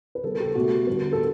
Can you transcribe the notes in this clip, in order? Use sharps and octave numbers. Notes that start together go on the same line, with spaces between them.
B4
C#3 G3 B3 A4
A4
G4
B2 A3 F#4
D3 G3 B3
A4